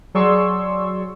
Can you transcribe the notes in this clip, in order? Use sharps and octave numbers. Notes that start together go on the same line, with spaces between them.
F#3 G#4 D5 C6 C#6 E6